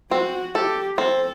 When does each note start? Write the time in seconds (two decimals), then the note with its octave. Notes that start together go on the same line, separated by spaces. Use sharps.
0.11 C4 F#4
0.55 G4 A4
0.98 C4 A4